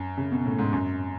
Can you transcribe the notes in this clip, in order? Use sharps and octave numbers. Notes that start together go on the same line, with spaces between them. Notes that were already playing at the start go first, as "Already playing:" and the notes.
Already playing: F#2
C#3
B2
A2
G#2
F#2